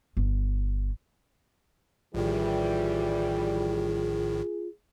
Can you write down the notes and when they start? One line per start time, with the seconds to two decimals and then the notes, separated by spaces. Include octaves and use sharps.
0.17 G1
2.14 A#1 A2 D#3 E3 G3 F4 G#4